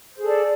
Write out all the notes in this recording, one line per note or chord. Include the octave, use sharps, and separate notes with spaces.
G#4 A4 C5 D5